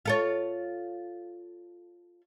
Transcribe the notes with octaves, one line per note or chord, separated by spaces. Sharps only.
F4 A4 C#5